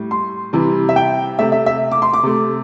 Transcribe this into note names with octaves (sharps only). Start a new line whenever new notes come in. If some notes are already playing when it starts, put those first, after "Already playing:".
Already playing: A2 G3
C6
C3 E3 G3
E5
G5
C3 A3 E5
E5
E5
D6
C6
D6
C3 A3